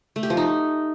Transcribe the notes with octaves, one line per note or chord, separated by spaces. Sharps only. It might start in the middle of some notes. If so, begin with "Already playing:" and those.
A3
G4
F3
D#4